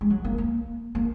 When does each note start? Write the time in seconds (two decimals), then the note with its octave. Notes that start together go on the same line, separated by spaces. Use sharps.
0.01 G#3
0.10 F#3
0.25 A#3
0.38 A#3
0.95 A#3